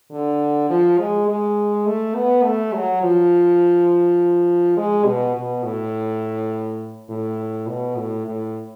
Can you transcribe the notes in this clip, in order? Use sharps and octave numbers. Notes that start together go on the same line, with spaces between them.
D3
F3
G#3
G#3
A3
B3
A3
F#3
F3
G#3
B2
B2
A2
A2
B2
A2
A2